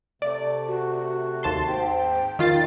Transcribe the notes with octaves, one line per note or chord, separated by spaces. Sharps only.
C3 A3 D5
F#4
D#2 A5 C6
G#2 C4 G5
E2 B2 D#3 F4 A6